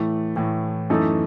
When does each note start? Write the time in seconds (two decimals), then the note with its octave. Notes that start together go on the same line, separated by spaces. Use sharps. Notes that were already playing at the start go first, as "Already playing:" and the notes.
Already playing: A2 E3 A3
0.36 A2 E3 A3
0.90 F#2 E3 A3 D#4 A4